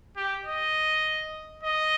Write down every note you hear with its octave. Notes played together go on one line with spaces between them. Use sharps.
G4
D#5
D#5